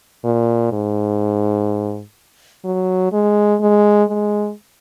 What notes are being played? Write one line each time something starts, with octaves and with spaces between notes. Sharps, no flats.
A#2
G#2
F#3
G#3
G#3
G#3